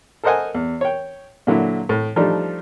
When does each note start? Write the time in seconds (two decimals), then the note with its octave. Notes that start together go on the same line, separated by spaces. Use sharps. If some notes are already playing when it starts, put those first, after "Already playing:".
0.23 A4 A#4 C5 D#5 F#5 G#5
0.54 E2
0.81 C#5 G5
1.47 A#2 D3 F#3 E4
1.89 A2
2.16 F3 G3 A3 D4 D#4